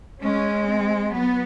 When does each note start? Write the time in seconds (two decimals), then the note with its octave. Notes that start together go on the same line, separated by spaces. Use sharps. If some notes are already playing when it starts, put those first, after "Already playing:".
0.22 G#3 C#4
0.66 C4
1.11 F#3 B3